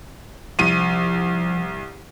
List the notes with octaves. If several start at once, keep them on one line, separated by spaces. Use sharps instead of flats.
C2 F3 D#7